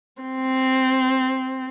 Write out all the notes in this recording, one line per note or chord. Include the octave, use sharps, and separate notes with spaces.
C4